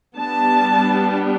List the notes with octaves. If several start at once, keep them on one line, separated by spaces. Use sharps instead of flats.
G3 B3 D4 A5